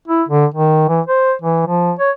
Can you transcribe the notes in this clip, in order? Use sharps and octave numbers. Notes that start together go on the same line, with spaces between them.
E4
D3
D#3
E3
C5
E3
F3
C#5